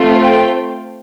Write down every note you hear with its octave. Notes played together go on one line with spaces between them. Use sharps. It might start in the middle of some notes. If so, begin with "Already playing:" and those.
Already playing: A3 C4 F4
G5